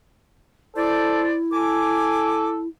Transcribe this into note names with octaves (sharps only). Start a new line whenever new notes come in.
E4 A4 C5 D5
A4 G#5 D6